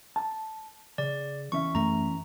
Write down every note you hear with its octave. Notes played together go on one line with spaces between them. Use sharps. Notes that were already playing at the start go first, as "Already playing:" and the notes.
A5
C#3 D5
E2 C#4 E5 C#6
F#2 A3 A#5